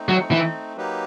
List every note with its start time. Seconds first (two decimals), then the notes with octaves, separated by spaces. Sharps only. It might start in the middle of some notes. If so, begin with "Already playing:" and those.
Already playing: A3 C4 D#4
0.09 F#3
0.31 E3
0.76 F#3 A#3 D#4 G4 B4